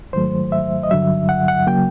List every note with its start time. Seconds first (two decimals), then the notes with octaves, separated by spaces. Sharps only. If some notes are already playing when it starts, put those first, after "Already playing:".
0.13 G#2 D#3 F#3 A3 C5
0.52 E5
0.83 D#5
0.91 G2 D3 F#3 E5
1.29 F#5
1.48 F#5
1.67 C#3 F#3 A#3 G5